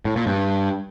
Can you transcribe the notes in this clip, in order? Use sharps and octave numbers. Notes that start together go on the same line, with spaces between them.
A2
A#2
G2